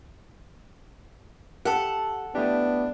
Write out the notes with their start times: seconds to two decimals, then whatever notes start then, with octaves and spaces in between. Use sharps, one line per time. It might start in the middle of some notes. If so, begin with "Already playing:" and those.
1.65 G4 A4 F#5
2.35 A3 B3 D4 E4 G4